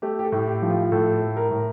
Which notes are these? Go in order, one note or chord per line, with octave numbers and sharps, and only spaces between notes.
A3 G4
G4
A4
A2
G4
F3
F4
A2 A4
A3
A#4
A2